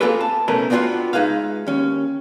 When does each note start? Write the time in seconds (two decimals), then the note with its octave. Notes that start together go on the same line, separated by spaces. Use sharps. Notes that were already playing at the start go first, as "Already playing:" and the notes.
0.01 A#3 C4 F4 G#4 A4 B4
0.20 A5
0.48 B1 B2 A3 C#4 A#4 B4
0.70 B3 C4 D4 D#4 F4 F#4
1.13 G#3 D#4 G#4 B4 E5 F5
1.67 D#2 C#4